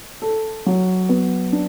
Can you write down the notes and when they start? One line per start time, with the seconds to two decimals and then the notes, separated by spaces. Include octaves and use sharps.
0.22 A4
0.66 F#3
1.09 B3
1.53 D4